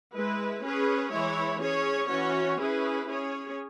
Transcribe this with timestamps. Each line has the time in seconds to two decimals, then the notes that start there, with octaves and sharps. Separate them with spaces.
0.13 G#3 E4 B4
0.62 C#4 G#4 B4
1.11 E3 G#3 E4 C#5
1.60 C#4 G#4 C#5
2.08 E3 C#4 F#4 C#5
2.57 C#4 E4 G#4 B4
3.07 C#4 G#4 C#5